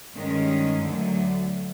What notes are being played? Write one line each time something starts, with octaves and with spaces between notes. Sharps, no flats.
G2 D#3 G#3 C#4
D2 D3 F#3 A3